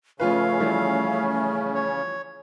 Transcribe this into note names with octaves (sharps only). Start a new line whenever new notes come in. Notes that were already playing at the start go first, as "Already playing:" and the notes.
C#3 F3 A3 C#4 F4 B4 F5
E3 F3 G3
C#5